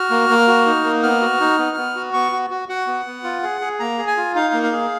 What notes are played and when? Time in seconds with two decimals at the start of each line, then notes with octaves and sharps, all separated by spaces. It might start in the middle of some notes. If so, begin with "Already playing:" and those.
Already playing: F#4 F6
0.10 A#3
0.29 A#3
0.48 F#4
0.66 D#4
0.84 A#3
1.03 B3 F6
1.21 F#4
1.40 D#4
1.59 B3
1.77 B3
1.96 F#4
2.13 B3 C#6
2.32 F#4
2.50 F#4
2.69 F#4 F#5
2.87 B3
3.06 B3
3.24 F4
3.43 G#4
3.61 G#4
3.80 A#3 A#5
3.98 G#4
4.07 G#5
4.17 F4
4.35 D#4 F5
4.53 A#3
4.63 F5
4.71 G#4